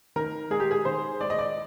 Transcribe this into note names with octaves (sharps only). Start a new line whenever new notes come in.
D#3 A#4
G#3 G#4
G4
G#4
D#3 C5
G#3 D5
D#5
D5